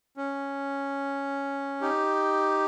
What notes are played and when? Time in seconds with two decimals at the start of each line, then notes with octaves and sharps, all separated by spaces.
0.17 C#4
1.81 D#4 G4